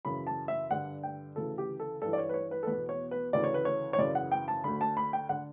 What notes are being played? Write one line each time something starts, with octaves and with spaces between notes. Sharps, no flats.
F#2 C#3 E3 B5
A5
E5
G2 D3 F#5
G5
D2 C#3 E3 A4
G4
A4
G2 E3 A4
D5
C#5
B4
C#5
B4
A4
E2 B2 B4
C#5
B4
D2 C#3 E3 D5
C#5
B4
C#5
C#5
F#2 C#3 E3 D5
F#5
G5
A5
D2 D3 B5
A5
B5
G5
D3 F#5